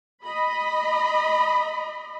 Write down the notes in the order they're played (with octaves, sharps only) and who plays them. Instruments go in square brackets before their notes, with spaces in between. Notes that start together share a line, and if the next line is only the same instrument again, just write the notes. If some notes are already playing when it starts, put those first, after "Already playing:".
[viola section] D#5 B5